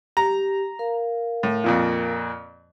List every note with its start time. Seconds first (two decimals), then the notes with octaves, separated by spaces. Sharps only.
0.17 G4 A#5
0.79 A#4 F5
1.43 A2
1.64 F2 A#2 F3